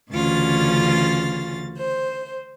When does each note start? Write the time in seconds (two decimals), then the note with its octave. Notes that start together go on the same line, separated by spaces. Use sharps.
0.11 D2 C#3 E3 C#4 F4 A6
1.78 C5